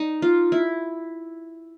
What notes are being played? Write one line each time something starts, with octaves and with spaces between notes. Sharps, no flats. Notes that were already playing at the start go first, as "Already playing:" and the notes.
Already playing: D#4
F4
E4